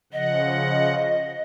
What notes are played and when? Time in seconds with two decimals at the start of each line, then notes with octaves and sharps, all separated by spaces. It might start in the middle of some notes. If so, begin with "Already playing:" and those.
0.13 C#3 F3 D#5 F#5